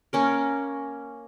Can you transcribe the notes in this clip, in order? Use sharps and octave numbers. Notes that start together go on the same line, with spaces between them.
A#3 C#4 A#4